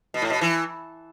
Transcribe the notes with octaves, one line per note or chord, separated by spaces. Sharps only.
B2
A2
B2
E3